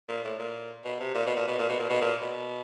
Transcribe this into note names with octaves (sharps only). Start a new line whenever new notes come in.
A#2
A2
A#2
B2
C3
A#2
B2
A#2
B2
A#2
B2
A#2
B2
A#2
B2